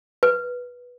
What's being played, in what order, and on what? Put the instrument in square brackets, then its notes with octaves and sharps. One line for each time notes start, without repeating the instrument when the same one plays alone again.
[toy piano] B4